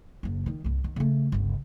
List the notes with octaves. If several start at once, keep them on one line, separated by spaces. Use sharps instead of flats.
F#1 D4
D#3 G#3
C2 G2
D#3
C#3 A3
G1 C#2